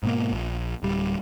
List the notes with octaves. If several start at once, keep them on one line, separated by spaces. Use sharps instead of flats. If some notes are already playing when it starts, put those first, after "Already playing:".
G#2 B2 A#3
A#1
D1 G3